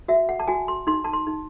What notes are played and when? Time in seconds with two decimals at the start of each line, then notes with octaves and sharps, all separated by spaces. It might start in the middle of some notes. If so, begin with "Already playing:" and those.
0.08 F#4 E5
0.29 F#5
0.40 A5
0.48 F#4 G#5
0.68 C6
0.87 D#4 C6
1.04 A5
1.13 C6
1.27 D#4